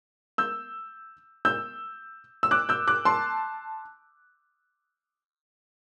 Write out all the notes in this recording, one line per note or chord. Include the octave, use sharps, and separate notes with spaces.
E6 G6
E6 G6
E6
D6 F#6
E6 G6
D6 F#6
A5 C6